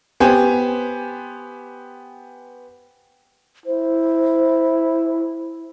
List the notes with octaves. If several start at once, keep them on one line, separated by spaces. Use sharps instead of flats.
B3 G4 C5 G#5
E4 C5